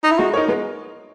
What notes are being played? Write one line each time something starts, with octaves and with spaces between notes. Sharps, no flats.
D#4
E4
G#3 F#4
D#4 A#4 C#5
G#3 B3